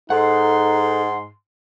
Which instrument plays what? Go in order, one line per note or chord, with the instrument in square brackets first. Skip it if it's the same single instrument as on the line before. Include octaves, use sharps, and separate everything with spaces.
[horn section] G#2 C6 [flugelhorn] D#4 [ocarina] A4 [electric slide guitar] F#5